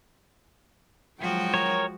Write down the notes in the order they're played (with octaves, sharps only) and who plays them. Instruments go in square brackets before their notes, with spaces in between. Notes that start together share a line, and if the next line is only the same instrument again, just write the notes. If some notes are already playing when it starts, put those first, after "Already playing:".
[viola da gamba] F3 G#3 F#4 [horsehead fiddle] F#3 G5
[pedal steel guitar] A#4 C#5